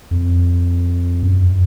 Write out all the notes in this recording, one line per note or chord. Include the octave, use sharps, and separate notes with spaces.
F2
F#2